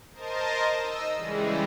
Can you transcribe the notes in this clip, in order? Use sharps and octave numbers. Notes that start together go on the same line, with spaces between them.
A#4 C5 D#5 A5
D#4 D#5 E6
C#3 E3 G3 G#3